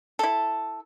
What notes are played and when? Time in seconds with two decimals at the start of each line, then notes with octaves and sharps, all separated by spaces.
0.19 E4 A4